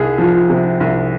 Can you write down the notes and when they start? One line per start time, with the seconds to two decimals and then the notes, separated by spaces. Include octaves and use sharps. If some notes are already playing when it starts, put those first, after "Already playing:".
Already playing: C2 G#4
0.18 F3
0.49 C3
0.80 C2